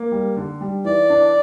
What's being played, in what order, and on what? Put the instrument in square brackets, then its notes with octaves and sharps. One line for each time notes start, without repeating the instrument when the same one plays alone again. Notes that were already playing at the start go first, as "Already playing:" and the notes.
Already playing: [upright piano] A#3
G3
D3
G3
[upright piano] E3 [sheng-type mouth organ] D5
[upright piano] D4